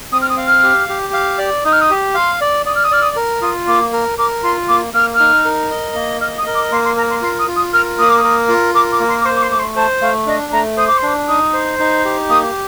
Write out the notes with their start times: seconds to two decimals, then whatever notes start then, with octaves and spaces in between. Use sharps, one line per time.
0.12 C4 D#6
0.21 F6
0.29 D#6
0.37 F5
0.46 F6
0.63 G4
0.89 G4
1.13 F5
1.38 D5
1.64 D#4 D#6
1.72 F6
1.81 D#6
1.90 G4
2.14 F5 C6
2.41 D5
2.65 D5 D#6
2.75 F6
2.84 D#6
2.91 D5 F6
3.02 D#6
3.16 A#4
3.42 F4 D#6
3.67 A#3 D6
3.93 A#4
4.18 A#4 D6
4.43 F4 C6
4.68 A#3 D6
4.94 A#3 F6
5.14 F6
5.20 D#4
5.45 A#4
5.71 D#5
5.95 A#3
6.21 D#5 F6
6.38 D#6
6.46 A#4
6.54 D6
6.72 A#3 C6
6.84 C6
6.96 A#4 A#5
7.10 C6
7.22 F4 C6
7.39 D#6
7.47 F4
7.56 D#6
7.73 A#4 F6
7.98 A#3 D#6
8.09 D6
8.18 D#6
8.24 A#4
8.49 F4
8.74 A#4 D6
8.91 D6
9.00 A#3
9.08 C6
9.21 D6
9.25 C5 C6
9.35 D6
9.42 C6
9.50 A3 D6
9.59 C6
9.76 C5 A5
10.01 A3 F5
10.26 D4 D#5
10.52 A3 A#5
10.77 C5 D#6
10.87 D6
10.97 C6
11.03 D4 D6
11.28 D#4 D#6
11.53 C5
11.79 D#4
12.05 G4
12.29 A#3 D#6